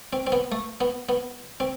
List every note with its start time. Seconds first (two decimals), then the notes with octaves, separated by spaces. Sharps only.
0.13 C4
0.27 C4
0.32 B3
0.52 A3
0.81 B3
1.09 B3
1.60 C4